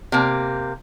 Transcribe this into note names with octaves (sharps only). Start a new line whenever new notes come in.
C3 A#3